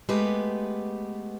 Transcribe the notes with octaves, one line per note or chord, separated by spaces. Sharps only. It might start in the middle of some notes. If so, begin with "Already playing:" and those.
G#3 A3 B3 G4 B4